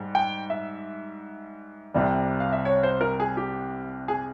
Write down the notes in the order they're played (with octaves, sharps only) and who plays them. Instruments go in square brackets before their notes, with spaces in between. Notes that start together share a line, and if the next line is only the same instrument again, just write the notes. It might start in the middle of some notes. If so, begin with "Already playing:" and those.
Already playing: [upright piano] G#2 G3
[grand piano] G5
E5
[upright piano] C2 C3 G3
[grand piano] F5
E5
C#5
C5
A#4
G#4
G4
G#4